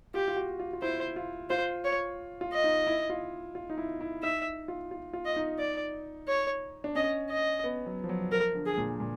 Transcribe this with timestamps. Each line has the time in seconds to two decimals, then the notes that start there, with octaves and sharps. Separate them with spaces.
0.14 F4 G4
0.28 F4
0.36 F#4
0.59 F4
0.73 F4
0.82 E4 C5
1.16 F4
1.50 F4 C5
1.85 C#5
2.41 F4
2.53 D#5
2.64 D#4
2.87 E4
3.10 F4
3.55 F4
3.70 D#4
3.78 E4
4.01 E4
4.23 D#4 E5
4.68 F4
4.91 F4
5.13 F4
5.25 D#5
5.36 D#4
5.59 D5
6.28 C#5
6.84 D4
6.95 C#4 D#5
7.30 D#5
7.64 B3
7.86 F#3
8.04 F3
8.09 F#3
8.32 F3 A#4
8.55 D3
8.66 G#4
8.78 A#2
9.00 A#2